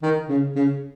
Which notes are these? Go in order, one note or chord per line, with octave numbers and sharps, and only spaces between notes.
D#3
C#3
C#3